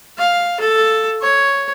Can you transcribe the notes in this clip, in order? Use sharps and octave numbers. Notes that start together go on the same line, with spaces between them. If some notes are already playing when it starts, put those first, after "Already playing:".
F5
A4
C#5